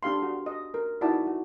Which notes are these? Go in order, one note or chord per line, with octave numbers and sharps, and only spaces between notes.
D4 G4 F5 C6
F#4
D#5
A#4
D#4 E4 F#4 D5 A5
F#4